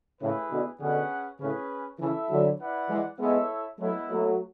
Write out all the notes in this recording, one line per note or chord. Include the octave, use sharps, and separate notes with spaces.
A2 C#3 A3 E4 G#4 B4
B2 D3
B2 D3 C#4 G#4 B4 F#5
A2 C#3 C#4 G#4 B4
C#3 E3 E4 A4 E5
D3 F#3
E4 B4 D5 F#5
E3 G#3
G#3 B3 E4 A4 C#5 E5
F#3 G#3 A3 B3 E4
F#3 A3